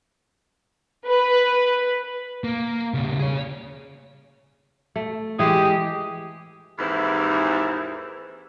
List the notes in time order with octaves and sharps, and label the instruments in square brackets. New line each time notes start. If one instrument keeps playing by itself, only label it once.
[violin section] B4
[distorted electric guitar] A#3
C#3 G3
G#4 C#5
[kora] A3
[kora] E3 G#3 [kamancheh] G4 [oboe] D#6
[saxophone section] D#2 G#2 E3 C4 E4